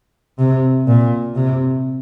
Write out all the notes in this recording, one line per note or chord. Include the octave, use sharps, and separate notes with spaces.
C3
A#2
C3